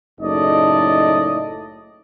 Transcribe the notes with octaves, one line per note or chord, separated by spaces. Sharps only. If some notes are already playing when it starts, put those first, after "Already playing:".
F#1 A2 D#4 A4 D5 D#5